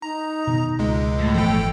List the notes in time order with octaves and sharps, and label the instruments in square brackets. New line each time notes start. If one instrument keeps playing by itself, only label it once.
[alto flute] D#4 [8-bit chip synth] A#5
[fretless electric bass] B2 D#3
[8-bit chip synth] C#2 G#3 [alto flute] D#5
[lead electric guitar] A2
[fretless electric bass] G1 E3 F3 [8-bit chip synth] A4 G5